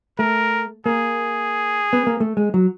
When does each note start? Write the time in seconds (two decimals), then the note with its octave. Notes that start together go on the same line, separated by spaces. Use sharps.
0.19 A3 A#4
0.86 A#3 G#4
1.93 B3
2.07 A#3
2.20 A3
2.37 G#3
2.54 F#3